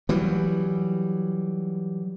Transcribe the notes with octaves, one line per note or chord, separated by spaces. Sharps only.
E3 F#3 G3